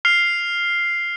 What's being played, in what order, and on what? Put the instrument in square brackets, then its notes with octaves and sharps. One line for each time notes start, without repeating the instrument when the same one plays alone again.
[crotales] F6 C7 F7